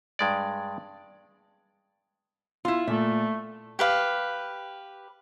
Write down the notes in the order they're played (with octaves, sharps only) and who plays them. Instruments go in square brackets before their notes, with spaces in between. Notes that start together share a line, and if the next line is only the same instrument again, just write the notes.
[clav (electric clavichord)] G2 G#3 D5
[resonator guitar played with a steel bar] E4 F4 [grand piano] C6
[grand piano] A#2 [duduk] A3 [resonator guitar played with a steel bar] E5
[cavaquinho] G4 B4 F5